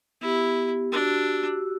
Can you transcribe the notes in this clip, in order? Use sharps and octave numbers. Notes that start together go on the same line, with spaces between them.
B3 E4 G4
D4 F#4 G4 E6